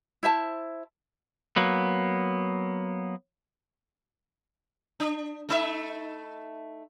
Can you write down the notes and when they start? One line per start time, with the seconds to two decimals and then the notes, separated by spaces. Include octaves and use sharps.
0.23 E4 C5 E5 A5
1.56 F#3 A#3 B3
5.00 D4
5.49 A3 D#4 E5